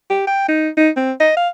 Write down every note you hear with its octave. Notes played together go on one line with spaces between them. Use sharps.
G4
G5
D#4
D#4
C4
D#5
F5